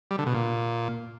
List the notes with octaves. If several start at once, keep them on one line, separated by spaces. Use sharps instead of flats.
G3
D3
B2
A#2